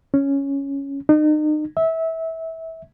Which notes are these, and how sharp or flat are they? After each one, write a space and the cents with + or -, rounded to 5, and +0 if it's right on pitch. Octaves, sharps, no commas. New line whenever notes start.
C#4 +0
D#4 -35
E5 -20